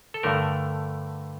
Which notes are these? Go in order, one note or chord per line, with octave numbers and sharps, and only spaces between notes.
A4
G2 D3 A3 A#4